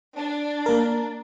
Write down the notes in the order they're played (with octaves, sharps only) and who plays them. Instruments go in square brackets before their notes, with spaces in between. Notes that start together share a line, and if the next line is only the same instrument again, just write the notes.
[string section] D4
[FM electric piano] A#3 A#4